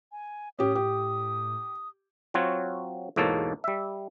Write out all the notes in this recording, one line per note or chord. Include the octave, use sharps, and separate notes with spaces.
G#5
A2 C#4 G4 D#6
G4
F#3 C4 F4 F#4 C#5
E2 G#2 B2 A#3 A4 C#5
G3 E5